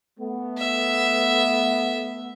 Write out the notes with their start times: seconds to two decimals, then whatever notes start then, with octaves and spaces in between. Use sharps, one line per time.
0.20 A3 B3
0.58 E5